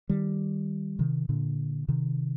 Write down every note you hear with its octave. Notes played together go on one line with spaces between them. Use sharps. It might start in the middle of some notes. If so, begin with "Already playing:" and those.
D#3 G3
C3 D#3
A#2 D3
C3 D#3